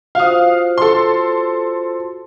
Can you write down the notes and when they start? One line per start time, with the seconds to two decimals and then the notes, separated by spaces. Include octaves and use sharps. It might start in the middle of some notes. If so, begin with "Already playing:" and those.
0.15 F4 F#4 C5 F5 D#6
0.78 A4 C6